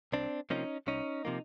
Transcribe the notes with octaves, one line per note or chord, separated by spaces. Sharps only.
C2 C4 D4
C3 F3 A#3 C#4 D#4
C2 C#4 D#4
C3 F3 A#3